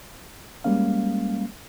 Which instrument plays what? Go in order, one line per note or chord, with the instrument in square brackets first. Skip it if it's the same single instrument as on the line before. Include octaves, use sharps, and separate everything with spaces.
[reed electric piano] G3 G#3 A#3 C#4 F5